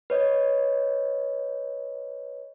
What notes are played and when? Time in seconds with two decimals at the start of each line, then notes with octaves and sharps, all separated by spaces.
0.10 B4 C#5 D#5